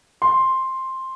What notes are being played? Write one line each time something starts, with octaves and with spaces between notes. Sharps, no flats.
C6